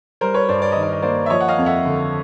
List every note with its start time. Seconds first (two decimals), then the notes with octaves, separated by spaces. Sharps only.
0.21 G3 A#4 C5
0.34 B4 C#5
0.49 G2 C5 D5
0.62 D5
0.72 D#3 D#5
0.83 D5
0.93 D#5
1.02 A#3 C5 D5
1.26 E5
1.30 F3 C#5 D#5
1.40 F#5
1.48 D#5 F5
1.58 F2
1.66 E5 F#5
1.85 D3